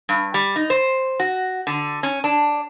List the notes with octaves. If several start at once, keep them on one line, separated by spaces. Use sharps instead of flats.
G2
G3
D#4
C5
F#4
D3
C#4
D4